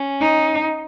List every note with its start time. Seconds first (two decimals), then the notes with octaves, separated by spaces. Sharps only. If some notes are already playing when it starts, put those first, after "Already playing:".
Already playing: C#4
0.21 D#4